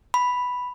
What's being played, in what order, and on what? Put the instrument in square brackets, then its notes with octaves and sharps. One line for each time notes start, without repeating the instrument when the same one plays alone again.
[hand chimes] B5